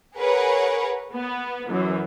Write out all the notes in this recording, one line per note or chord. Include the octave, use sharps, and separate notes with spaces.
G#4 A#4 B4 C#5 F#5
B3
F#2 E3